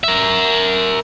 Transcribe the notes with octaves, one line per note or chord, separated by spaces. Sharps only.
A#4 E5